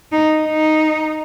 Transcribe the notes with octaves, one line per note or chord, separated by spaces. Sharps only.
D#4
D#4